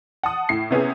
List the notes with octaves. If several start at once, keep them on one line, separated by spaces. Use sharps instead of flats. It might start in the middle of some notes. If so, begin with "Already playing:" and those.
F#5 A5 D#6
A2 C7
C3 B3 C#4 G#4